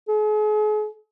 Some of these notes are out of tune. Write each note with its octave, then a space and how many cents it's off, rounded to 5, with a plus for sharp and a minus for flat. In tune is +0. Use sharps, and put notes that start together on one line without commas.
G#4 +40